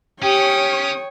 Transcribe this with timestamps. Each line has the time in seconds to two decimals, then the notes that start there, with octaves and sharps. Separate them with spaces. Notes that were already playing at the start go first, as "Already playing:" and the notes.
0.23 C#4 G4 C#5 G5 D#6